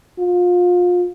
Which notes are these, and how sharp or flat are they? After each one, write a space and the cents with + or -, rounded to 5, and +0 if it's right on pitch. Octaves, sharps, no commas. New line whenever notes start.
F4 +30